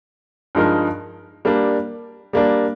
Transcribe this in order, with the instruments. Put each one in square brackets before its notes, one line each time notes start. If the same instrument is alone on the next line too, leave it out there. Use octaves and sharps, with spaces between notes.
[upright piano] G2 F3 G#3 D#4 A#4
G3 A#3 D4
G3 A#3 D4